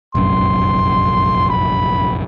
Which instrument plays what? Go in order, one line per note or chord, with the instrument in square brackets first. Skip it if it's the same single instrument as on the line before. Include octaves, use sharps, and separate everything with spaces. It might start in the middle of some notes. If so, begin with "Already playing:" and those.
[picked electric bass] F1 A#1 F#2 [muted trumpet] C6
[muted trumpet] B5